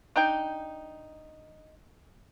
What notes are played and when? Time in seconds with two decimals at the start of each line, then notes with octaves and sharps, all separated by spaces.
0.16 D4 D#4 G5